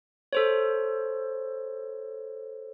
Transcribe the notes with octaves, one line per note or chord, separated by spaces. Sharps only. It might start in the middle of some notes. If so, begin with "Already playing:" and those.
A4 C5 C#5